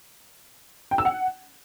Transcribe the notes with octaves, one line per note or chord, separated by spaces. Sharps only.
G5
E6
F#5